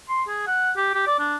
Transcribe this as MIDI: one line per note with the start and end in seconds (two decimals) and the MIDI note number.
0.09 0.23 84
0.28 0.47 68
0.47 0.71 78
0.76 0.91 67
0.94 1.06 67
1.07 1.17 74
1.20 1.37 62